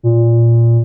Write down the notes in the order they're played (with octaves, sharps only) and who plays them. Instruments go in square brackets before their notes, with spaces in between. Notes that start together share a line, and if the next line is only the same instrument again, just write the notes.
[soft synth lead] A#2